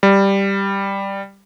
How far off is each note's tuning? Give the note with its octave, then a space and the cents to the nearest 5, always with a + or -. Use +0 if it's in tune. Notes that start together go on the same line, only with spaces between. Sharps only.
G3 +5